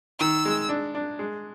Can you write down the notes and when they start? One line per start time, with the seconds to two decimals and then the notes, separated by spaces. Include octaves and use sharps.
0.20 D#3 E6
0.45 G#3
0.69 D4
0.95 D4
1.19 G#3